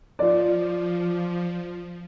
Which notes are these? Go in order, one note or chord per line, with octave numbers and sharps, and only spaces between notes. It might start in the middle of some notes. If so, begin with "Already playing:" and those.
F3 F4 D5